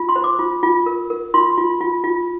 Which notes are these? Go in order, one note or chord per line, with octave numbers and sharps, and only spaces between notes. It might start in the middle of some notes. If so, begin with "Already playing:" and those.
Already playing: F4
C6
C5
D6
F4
F4
A#4
A#4
F4 C6
F4
F4
F4